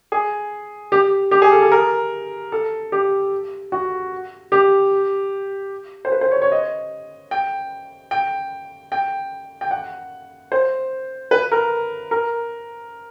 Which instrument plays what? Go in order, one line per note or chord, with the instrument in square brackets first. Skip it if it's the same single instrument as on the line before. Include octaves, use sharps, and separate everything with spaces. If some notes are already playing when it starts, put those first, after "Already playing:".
[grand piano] G#4
G4
G4
G#4
A4
A4
A#4
A4
G4
F#4
G4
C5
B4
C5
C#5
C#5
D#5
G5
G5
G5
G5
F#5
C5
B4
A#4
A#4